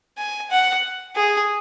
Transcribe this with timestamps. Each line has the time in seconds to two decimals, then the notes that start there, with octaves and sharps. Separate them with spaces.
0.18 G#5
0.51 F#5
1.16 G#4